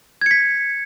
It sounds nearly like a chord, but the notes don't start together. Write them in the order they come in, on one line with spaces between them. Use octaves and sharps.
G#6 C#7 B6